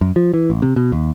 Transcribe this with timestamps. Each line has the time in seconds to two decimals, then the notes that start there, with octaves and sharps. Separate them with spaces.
0.01 F#2
0.16 F3
0.34 E3
0.50 A1
0.62 C3
0.76 B2
0.92 D#2